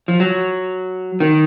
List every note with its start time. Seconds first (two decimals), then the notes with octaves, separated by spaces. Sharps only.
0.08 F3
0.20 F#3
1.20 D#3